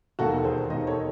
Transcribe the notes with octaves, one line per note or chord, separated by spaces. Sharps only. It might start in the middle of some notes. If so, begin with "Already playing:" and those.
E1 D#2 D#3 F#4 A4
A4
G#4 C5
E1 D#2 D#3 C5 D#5
A4 C#5